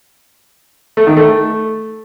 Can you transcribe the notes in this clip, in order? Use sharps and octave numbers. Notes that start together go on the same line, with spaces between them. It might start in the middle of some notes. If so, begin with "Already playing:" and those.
A3
D#3
A3